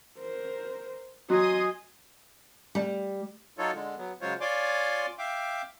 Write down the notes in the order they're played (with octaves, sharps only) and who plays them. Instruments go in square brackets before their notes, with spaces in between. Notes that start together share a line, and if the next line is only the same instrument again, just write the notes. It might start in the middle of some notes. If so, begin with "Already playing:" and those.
[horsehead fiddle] A#4 C5
[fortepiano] F#3 [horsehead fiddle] D#5 G#5 [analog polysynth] C6 D#6
[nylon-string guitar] G3
[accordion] F#3 D#4 F4 A4 C#5
D3 G#3
F#3 B3
C#3 F#3 G#3 F4 C5 C#5
F4 C#5 D5 G#5 C6 D6
E5 F5 G5 D6